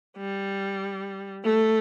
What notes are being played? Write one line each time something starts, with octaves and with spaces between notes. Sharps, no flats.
G3
A3